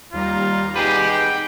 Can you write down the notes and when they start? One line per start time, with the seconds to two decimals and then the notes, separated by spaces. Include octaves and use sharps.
0.13 D#2 G3 F4 A#5
0.76 D#4 G4 G#4 B4 F#5
1.11 G5